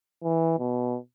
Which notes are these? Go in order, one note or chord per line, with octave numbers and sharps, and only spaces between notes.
E3
B2